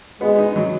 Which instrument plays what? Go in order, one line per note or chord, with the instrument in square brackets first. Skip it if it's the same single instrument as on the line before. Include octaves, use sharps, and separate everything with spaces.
[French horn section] G#3 [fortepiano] B3
[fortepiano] D#4
F#3